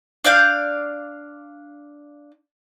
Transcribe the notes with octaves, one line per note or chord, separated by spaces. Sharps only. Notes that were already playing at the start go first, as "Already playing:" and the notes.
D4 D5 F5 G6